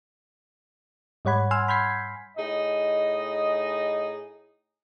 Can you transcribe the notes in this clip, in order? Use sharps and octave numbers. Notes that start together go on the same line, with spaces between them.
G#2 G3 C#5 F#5 B5 G#6
F#5 G#5 C6 E6 F6
B5 F6 G6 G#6 B6 C7
A2 D#4 G#4 D#5